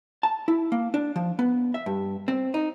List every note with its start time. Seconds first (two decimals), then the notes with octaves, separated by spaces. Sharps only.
0.23 A5
0.48 E4
0.72 A#3
0.94 D4
1.16 F3
1.39 B3
1.74 E5
1.86 G2
2.28 C4
2.54 D#4